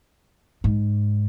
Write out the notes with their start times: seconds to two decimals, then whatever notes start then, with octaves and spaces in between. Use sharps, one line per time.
0.64 G#2